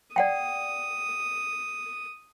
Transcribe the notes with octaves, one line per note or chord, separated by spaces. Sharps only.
D5 F#5 G5 D#6